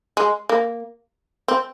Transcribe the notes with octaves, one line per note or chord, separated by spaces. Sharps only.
G#3
A#3
C4